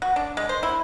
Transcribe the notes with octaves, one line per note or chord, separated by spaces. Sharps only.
F#4
D4
G#3
C5
E4